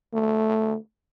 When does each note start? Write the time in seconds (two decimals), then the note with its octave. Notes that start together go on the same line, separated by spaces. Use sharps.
0.14 A3